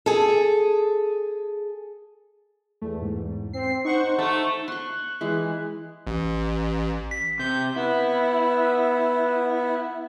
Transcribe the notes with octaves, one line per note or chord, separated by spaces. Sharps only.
G#4 A4
E2 A3
G#2
C4 C7
D#4 C5 F#5 C#6
A3
C6 C#6 F#6
E3 G#3
A1
B6
C3 G6
B3 E4